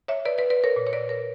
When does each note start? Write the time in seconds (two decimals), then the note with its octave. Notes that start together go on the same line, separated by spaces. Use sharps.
0.08 C#5 E5
0.25 B4 D5
0.38 B4 D5
0.50 B4 D5
0.64 A#4 C#5
0.76 A#2
0.87 C#5
0.93 B4 D5
1.09 A#4 C#5